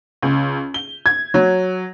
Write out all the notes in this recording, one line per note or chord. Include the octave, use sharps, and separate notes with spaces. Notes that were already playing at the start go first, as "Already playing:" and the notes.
C#2
G7
G#6
F#3